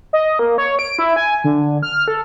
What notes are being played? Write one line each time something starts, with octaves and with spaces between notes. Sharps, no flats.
D#5
A#3
C#5
D7
E4
G#5
D3
F6
A4